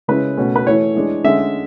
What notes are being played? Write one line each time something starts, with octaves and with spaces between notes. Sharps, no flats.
C#3 G#3 C#4 E4 B4
B2 A3 C#4
B4
E3 A3 E4 C#5
E3 G#3 D4
D3 G#3 C#4 E5